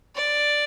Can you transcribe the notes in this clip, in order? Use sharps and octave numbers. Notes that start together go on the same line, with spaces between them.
D5